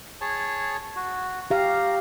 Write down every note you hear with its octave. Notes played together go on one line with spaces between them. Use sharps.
G#4 C#5 A5
F#4
G4 F5 A#5